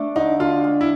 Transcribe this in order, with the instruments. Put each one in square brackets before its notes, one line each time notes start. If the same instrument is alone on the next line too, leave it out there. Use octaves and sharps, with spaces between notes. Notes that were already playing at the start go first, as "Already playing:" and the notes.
Already playing: [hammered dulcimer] A3 D4 A4
[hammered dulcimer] D3 [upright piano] D#4
[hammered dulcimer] D3 [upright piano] F4
[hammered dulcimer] G#3
[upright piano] E4